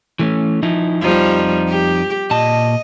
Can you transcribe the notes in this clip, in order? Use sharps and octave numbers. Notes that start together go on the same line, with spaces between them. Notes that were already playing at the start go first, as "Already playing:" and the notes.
E3 A3 C#4
F3 D#4 E4
F2 F3 G3 D#4
G4
A#2 D#5 A5